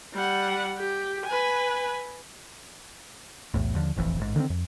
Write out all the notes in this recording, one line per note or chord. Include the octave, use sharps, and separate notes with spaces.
G3 F#5
G4
B4 G#5
B1 E2 A2
D#2 D3 F3
E1 A1 F2 E3
A1 G#2
D3 D#3 B3 C4
F2